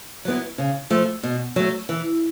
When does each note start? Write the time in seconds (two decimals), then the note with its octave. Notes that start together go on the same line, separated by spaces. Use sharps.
0.25 F#3 B3 E4
0.58 C#3
0.90 F3 A3
1.23 B2
1.56 F#3 A3
1.89 E3